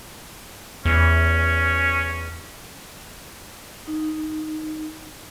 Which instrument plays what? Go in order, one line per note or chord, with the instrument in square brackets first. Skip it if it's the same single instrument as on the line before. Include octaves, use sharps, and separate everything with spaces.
[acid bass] E2 [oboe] C#4
[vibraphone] D#4